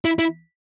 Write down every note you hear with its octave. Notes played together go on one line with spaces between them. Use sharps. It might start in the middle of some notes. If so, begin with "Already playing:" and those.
E4
E4